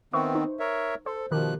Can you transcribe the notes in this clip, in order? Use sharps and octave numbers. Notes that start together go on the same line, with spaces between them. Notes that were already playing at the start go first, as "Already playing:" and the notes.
D#3 B3 C4 B4 E5 C#6
D#4 C5
A#4 C#5 E5
A4 C5
B2 D#3 F3 G4 A#4 F#6